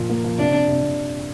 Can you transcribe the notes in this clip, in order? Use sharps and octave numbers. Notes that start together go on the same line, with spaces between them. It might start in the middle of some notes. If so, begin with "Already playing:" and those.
Already playing: A#2 F3 F4
A#3
F3
C3 D4
C3
C3
C3